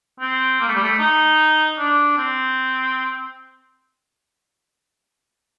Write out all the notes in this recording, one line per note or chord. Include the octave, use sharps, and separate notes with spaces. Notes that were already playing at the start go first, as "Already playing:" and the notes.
C4
A#3
A3
G3
A3
D#4
D4
C4